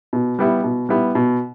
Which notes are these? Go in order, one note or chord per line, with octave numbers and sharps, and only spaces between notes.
B2
G3 B3 E4
B2
G3 B3 E4
B2